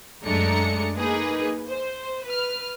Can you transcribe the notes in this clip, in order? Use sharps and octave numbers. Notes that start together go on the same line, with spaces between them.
F#2 G#3 A3 D4 A#5 C#7
A#3 D#4 G#4 B4
C5
B4 F6